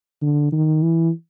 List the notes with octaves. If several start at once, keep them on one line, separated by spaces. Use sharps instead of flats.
D3
D#3
E3